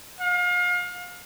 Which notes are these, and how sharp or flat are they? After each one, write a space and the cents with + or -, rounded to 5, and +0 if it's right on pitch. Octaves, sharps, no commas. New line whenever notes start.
F5 +35